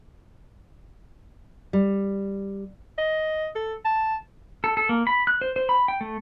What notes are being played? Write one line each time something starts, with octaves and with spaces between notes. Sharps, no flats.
G3
D#5
A4
A5
A4
A4
A#3
B5
F#6
C5
C5
B5
G5
A3